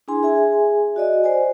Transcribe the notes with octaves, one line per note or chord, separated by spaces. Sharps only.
D4 E4 G#4 G#5 C6
G#4 E5 G#5
F#4 D5 D#5
C5 D5 G#5